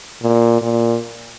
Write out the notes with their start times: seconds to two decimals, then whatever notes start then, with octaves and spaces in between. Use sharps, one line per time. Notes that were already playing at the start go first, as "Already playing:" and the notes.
0.22 A#2
0.61 A#2